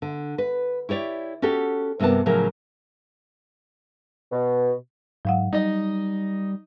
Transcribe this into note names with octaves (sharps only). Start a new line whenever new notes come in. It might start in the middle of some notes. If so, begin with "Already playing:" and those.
D3
B4
E4 G4 C#5 D5
C#4 F#4 G4 A4
G2 C3 A#3 B3 A5
A2 C#3 F3 F#3 A#4
B2
G#2 F#3 F5 F#5
G3 D#4 D#5